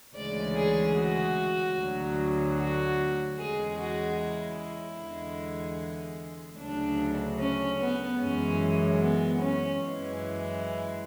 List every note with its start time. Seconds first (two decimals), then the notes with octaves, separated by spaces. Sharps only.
0.16 D2 C#3 E3 G#3 D5
0.56 G#4
0.96 F#4
1.77 D2 D3 F#3
2.58 F#4
3.39 E2 C#3 G#3 G#4
3.79 F#4
4.18 E4
4.99 E2 D3 G#3
6.60 D2 C#3 F#3 D4
7.40 C#4
7.80 B3
8.21 F#2 E3 G#3 C#4
9.02 B3
9.41 C#4
9.81 F#2 E3 G#3
10.22 E4